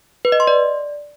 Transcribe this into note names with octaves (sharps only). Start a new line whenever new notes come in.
B4
D#5
C6
D5